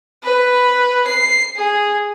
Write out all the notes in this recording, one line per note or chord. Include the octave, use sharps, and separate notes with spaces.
B4
C7
G#4